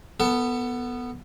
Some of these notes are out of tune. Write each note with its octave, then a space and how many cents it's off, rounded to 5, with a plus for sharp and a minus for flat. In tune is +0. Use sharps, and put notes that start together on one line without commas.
B3 +0 A4 +25